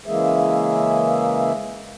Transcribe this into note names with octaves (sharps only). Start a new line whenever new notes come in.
C#3 E3 G#3 A#3 G#4 E5